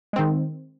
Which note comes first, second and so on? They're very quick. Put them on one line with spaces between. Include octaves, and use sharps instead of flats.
G#3 C4 D#3